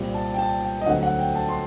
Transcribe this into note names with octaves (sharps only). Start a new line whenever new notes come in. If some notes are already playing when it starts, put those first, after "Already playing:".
Already playing: C2 A#2 G3 C4
A5
G5
A5
G5
D#5
D2 D3 F#3 C4 F#5
F#5
G5
A5
C6